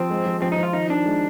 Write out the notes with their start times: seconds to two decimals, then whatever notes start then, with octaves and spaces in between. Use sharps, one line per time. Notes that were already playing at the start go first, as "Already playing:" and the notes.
Already playing: F3 C4
0.10 G#3
0.26 F3
0.42 F3 C4
0.52 D#4
0.57 F3
0.63 F4
0.73 D#3 D#4
0.90 D#3 D4
1.05 G#3